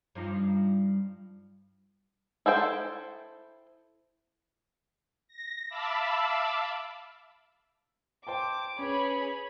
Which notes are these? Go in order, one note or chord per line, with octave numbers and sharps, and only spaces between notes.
G2 F3 D#4
E4 A4 C5 G5
A#6
E5 F5 A5 B5 D6 E6
C5 G5 A5 D6
C#4 G#4 B4 C#5 B5